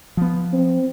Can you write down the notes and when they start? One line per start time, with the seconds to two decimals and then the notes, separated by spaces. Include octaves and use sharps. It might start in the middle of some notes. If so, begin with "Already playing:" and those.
0.17 F3 B3
0.53 C4